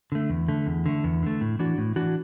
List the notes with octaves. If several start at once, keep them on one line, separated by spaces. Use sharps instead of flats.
D3 A3
E2
D3 A3
E2
D3 A3
E2
D3 A3
A2
E3 D4 F#4
A2
E3 D4 F#4